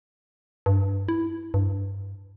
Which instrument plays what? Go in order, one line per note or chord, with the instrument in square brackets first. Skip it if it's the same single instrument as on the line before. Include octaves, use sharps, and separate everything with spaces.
[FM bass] G2
E4
G2